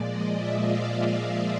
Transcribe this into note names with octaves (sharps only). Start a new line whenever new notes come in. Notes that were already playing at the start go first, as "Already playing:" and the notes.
Already playing: A#2 F3 G#3 D5
D#5
E5
F5